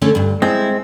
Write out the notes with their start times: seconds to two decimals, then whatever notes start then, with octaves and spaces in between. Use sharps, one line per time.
0.02 D3 A3 C#4
0.15 D2 G2
0.42 G#3 C4 E4